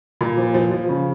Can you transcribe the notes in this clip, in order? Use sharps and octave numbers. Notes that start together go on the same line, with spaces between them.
A#2
F3
F3
F3
C#3